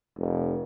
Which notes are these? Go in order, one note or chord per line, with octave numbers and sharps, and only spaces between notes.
F1